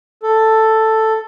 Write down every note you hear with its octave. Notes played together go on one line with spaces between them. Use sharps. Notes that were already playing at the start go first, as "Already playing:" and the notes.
A4